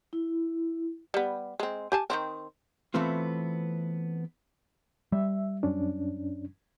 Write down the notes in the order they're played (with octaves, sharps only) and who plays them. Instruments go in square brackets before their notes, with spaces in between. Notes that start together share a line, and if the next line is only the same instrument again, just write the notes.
[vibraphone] E4
[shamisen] G3 B3
G#3 C4
G4 G#5 A5
D#3 E3 C4
[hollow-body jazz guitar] E3 A3 B3 C4 F4
[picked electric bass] G3 [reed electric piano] E5
[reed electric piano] F#2 C#4 D4